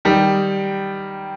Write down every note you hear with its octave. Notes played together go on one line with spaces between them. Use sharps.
D#3 G3